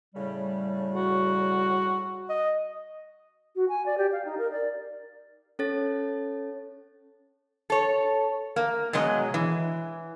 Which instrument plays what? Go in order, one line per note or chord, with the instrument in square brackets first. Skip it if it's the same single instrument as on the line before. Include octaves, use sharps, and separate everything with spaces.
[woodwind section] A2 C#3 G3
[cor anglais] F#4
D#5
[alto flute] F#4
G#5
D5
G4
F5
D#4
A#4
D5
[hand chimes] C#4 A4 C#5 A6
[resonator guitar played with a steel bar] A4 C#5
A#3
B2 F#3 G#3 D#5
E3